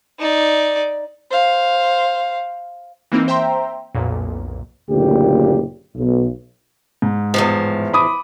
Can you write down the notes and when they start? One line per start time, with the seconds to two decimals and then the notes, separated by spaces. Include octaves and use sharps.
0.20 D#4 D5
1.30 C5 F5
3.12 E3 A#3 C4 D#4
3.28 C5 E5 G5 A#5 C6
3.95 B1 F2 A#2
4.89 F#1 D2 A#2 G4
5.96 B1
7.02 G#2
7.34 E2 A2 F3
7.94 B5 D6 D#6